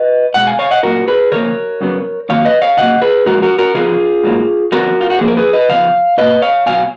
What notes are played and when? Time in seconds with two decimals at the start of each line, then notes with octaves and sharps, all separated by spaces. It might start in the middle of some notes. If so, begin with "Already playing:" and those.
Already playing: B4 D#5
0.34 B2 G#3 F#5
0.47 F5 G#5
0.59 C#5 F5
0.71 D#5 F#5
0.83 A#2 F#3 A#3 F#4 A#4
1.08 G#4 B4
1.32 C#3 F3 A#3 A#4 C#5
1.81 F#2 C#3 F#3 B3
2.29 F2 D#3 F#3 A#3 C#5 F5
2.45 B4 D#5
2.62 C#5 F5
2.77 C#3 F#3 A#3 D#5 F#5
3.02 G#4 B4
3.25 A#2 F3 G#3 F#4 A#4
3.42 F#4 A#4
3.59 F#4 A#4
3.74 C#3 F3 B3 F4 G#4
4.23 G#2 F#3 A#3
4.72 F2 F3 B3 F#4 A#4
5.01 F4
5.10 F#4
5.19 F#2 F3 A#3 G#4
5.28 A#4
5.37 G#4 B4
5.53 B4 D#5
5.69 C#3 F3 B3 F5
6.18 B2 A#3 B4 D#5
6.42 C#5 F5
6.66 B2 F#3 B3 F5 G#5